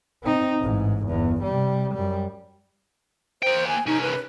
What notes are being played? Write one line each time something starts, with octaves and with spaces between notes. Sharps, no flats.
C4 D#4
A1 G#2
G1 E2
C3 G3
F#2 G3
A#3 C5 G5
G#5
C2 C#4 D#4
B4